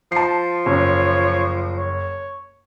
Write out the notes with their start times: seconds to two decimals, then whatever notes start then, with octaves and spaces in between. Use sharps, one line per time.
0.12 F3 A5 C7
0.66 F#1 C#5
1.76 C#5